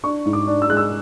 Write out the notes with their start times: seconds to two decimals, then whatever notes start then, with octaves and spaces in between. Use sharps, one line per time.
0.03 D4 C#6
0.26 G#2
0.33 D6
0.47 D4
0.62 E6
0.69 G#3 F#6
0.77 E6